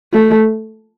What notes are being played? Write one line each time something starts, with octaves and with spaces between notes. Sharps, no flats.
A3